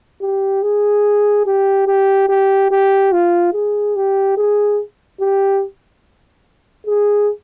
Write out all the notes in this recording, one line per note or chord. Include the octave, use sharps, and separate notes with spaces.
G4
G#4
G4
G4
G4
G4
F4
G#4
G4
G#4
G4
G#4